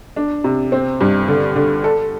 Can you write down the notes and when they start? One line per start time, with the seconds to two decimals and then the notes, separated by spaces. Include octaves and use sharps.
0.16 D4
0.44 C3
0.72 C4
1.01 G2
1.28 D3
1.56 D3
1.84 A4